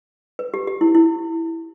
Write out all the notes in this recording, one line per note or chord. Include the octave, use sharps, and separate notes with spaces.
B4
G4
G4
E4
E4